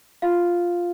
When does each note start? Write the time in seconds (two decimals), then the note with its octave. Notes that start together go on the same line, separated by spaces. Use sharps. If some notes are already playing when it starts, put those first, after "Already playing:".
0.22 F4 F5